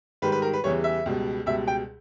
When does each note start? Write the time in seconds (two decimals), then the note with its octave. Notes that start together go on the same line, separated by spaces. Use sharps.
0.22 G#2 D#3 G3 B4
0.32 B4
0.42 A#4
0.53 B4
0.64 E2 C#3 E3 G3 C#5
0.84 E5
1.06 C#2 B2 G3
1.46 C#2 B2 G3 E5
1.68 G5